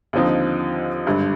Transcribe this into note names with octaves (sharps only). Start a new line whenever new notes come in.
D#2 D3 F3 C4 D#4
G#1 G2 D3